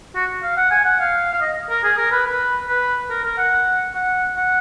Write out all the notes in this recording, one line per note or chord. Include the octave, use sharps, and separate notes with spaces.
F#4
F5
F#5
G#5
F#5
F5
F5
D#5
A#4
G#4
A#4
B4
B4
B4
A#4
A#4
F#5
F#5
F#5